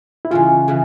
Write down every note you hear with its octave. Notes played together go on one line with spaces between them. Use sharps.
E4
C#3 E3 G#3 C#4 F4
C#3 E3